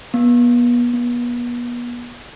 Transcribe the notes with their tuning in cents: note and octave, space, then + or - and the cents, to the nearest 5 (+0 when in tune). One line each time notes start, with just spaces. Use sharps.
B3 -35
B3 -35